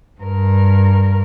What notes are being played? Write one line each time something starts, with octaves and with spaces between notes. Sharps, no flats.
G2 A#4